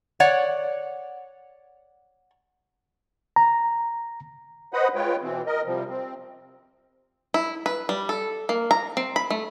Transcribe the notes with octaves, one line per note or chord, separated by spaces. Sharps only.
C#5 D5 F#5
A#5
B4 C5 D#5 F#5 B5 D#6
G#3 F4 B4 C#5 G5
B2 E3 C4
A#4 D#5
C3 F3 G3
C4
E4
B4
G3
A4
A#3
A#5
C4
B5
A3